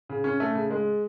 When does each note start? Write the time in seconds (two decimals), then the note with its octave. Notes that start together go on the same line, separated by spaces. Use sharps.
0.09 C#3
0.24 C#4
0.40 A3
0.55 C#3
0.71 G#3